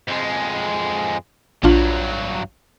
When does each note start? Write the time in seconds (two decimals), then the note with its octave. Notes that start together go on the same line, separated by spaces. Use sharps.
0.08 F2 G#3
1.64 A#1 G2 F#3 D4 F4